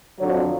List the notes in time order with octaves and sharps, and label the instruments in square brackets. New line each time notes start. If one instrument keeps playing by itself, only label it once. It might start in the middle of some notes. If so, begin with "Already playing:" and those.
[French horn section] F2 D3 F#3 C#5